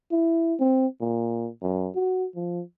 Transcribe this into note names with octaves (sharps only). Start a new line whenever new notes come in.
E4
C4
A#2
F#2
F#4
F3